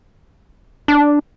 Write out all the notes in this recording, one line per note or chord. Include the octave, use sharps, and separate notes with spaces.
D4